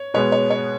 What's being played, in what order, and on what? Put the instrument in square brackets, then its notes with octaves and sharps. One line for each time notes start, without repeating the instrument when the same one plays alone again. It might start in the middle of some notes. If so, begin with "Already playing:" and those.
Already playing: [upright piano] C#5
[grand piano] B2 G#3 B3 [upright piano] C#5
[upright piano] C#5
C#5